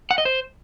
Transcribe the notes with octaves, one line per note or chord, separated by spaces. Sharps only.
F#5
D#5
C5